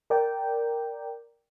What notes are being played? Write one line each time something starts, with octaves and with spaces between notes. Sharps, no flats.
A#4 D5 G5